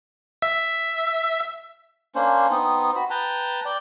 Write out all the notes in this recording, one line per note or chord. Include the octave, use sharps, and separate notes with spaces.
E5
A#3 C#4 D4 C5
B3 C4 D#4
F#4 B5
B4 G5 A5 A#5
D5 G5